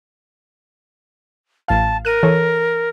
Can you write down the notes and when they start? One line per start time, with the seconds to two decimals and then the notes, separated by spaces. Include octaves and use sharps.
1.68 A1 F5 A5
2.05 A#4 F#6 D#7
2.23 E3 A4 C#5